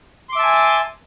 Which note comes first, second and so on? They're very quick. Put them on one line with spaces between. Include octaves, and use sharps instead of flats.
C6 D6 E5 A5 G#5